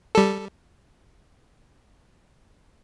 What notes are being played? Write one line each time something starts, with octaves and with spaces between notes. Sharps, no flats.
G3 A4